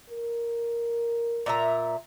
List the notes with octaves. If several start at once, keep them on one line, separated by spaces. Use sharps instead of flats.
A#4
A#2 E5 A#5